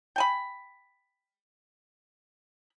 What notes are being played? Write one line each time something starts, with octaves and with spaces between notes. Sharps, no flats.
G5 G#5 B5